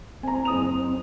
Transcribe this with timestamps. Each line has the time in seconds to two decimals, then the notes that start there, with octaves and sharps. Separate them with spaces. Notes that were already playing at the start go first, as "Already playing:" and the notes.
0.23 C4 G#5 A#5
0.45 F#1 D#6 F7